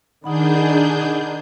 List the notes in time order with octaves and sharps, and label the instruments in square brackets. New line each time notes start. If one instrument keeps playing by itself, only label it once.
[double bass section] D#3 [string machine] D4 G#4 G6 [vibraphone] D#4 F#5 B5